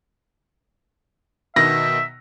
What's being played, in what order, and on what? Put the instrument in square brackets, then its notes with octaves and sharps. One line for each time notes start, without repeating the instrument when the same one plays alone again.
[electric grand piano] B2 D#3 B3 [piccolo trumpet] E5 [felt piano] A#6